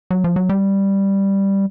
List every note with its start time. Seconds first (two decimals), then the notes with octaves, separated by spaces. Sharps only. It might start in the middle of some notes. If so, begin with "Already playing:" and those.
0.11 F#3
0.24 F3
0.36 F#3
0.49 G3